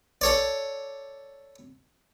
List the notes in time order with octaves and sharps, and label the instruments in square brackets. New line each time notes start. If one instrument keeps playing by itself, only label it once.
[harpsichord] A4 C#5 D5